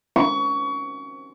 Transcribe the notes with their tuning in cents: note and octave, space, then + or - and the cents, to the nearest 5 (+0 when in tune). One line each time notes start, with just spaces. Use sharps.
C#6 +25